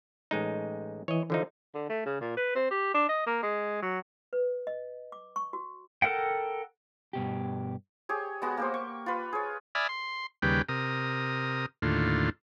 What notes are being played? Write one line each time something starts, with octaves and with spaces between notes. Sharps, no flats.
A1 G#3 D#4
E3 C#5 D#5
D3 F3 D#4
D3
A3
C#3
A#2
B4
C4
G4
D4
D#5
A#3
G#3
F#3
B4
D#5
D6
C#6
F#4
A4 A#4 F#5 G5
G2 B2 G4
G4 G#4 C#5
G#3 B3 F#4
A#3 G4 C5
C#6
F4 B4
G#4 C#5
D5 E5 G#5 B5 D#6 F6
C6
D#2 C#3 G3 B4 G5
C3 A#4 D#6
D#2 A2 D3 F4